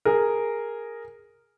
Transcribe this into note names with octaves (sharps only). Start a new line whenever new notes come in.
G#4 A#4